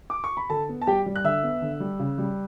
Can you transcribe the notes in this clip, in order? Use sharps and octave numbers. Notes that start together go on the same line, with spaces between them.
D6
C#6
B5
D3 A4 A5
B3
A5
G3 G4 G5
G3
F#6
D3 E5 E6
B3
D3
G3
C#3
G3